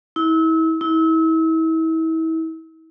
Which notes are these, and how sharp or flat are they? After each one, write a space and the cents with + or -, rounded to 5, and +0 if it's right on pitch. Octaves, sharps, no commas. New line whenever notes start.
E4 -35
E4 -35